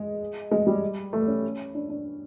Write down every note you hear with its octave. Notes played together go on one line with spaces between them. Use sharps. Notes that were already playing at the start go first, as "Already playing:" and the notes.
Already playing: G#3
G#3
G3
A3
C#4
D4
D4